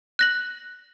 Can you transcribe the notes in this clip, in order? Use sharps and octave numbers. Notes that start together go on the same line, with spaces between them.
F#6 A#6 F#7